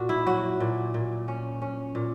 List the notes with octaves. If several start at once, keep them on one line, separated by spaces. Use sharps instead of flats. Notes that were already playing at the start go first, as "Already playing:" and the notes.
Already playing: A#2 F#4
E4
F#3 F#4
A#2
A#2
C#4
C#4
A#2